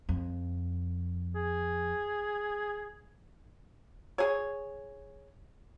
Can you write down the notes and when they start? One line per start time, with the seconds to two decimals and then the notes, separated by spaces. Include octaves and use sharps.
0.09 F2
1.36 G#4
4.18 G#4 C#5